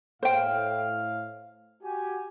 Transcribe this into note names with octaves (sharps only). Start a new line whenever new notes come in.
A2 C5 F5 G5
F#4 G4 G#5